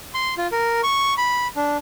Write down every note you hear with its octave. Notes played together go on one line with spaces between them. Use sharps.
C6
F4
A#4
C#6
B5
D4